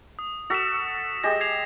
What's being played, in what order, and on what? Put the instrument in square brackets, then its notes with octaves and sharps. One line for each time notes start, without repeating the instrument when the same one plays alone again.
[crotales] D#6
[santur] F#4 A4 [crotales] E6 B6 E7
[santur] G#3 G4 [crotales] A#6
[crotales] G#6 C7 F7